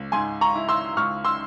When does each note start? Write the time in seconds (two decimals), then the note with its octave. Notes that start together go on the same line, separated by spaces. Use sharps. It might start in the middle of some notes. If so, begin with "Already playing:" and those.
Already playing: C#2
0.12 G#2 G#5 C6
0.41 A#5 C#6
0.55 E4
0.69 C6 E6
0.97 C#2 C#6 F6
1.25 C6 E6